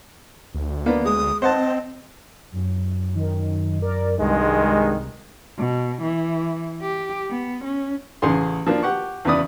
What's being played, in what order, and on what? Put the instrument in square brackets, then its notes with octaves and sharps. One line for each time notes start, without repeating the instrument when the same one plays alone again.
[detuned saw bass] D2
[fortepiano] A#3 B3 D4
[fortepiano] G#3 [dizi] D#6
[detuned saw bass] C4 [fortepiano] C5 F#5 A5 [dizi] D#5
[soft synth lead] F#2
[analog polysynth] D#3
A#4 D5
[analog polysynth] C2 [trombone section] G2 D#3 G#3
[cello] B2
E3
G4
B3
C#4
[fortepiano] A1 C#3 G#4 C6
F3 A#3 D4
G4 F#5 C#6
E2 C#3 B3 B4 D5 D#6